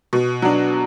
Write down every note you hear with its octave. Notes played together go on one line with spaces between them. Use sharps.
B2
F#3 D4